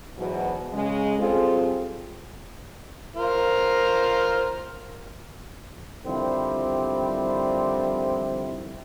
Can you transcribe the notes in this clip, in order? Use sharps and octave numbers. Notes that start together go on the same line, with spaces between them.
E2 G#2 B2 E3 F#3
C#3 G#3
G3 C4 F4 G#4 A4
F4 A#4 C5
D3 D#3 F3 G3 C4 E4